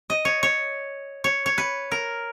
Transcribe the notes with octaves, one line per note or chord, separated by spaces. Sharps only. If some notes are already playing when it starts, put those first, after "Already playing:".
D#5
C#5
C#5
C#5
C#5
B4
A#4